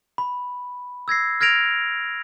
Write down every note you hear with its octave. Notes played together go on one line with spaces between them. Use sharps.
B5
E6 G#6 A#6 C7
F6 G#6 A#6 D7 F7